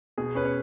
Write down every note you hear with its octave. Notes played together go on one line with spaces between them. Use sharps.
B2 G#4
C#4 B4
C#5